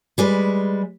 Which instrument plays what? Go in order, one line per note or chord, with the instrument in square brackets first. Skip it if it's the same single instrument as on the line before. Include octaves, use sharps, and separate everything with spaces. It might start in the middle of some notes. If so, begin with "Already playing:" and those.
[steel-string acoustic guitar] G3 G#3 B4